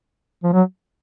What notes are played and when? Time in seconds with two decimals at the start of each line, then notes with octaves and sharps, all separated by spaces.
0.44 F3
0.53 F#3